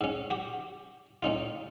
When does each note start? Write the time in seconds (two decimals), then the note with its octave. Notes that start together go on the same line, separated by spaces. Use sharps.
0.01 G#2 C#4
0.30 F#4 G4
1.23 A2 C#4 D#4 F4